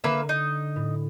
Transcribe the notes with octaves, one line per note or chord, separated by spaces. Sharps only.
D3 A#3 B4 E5
D#4
A2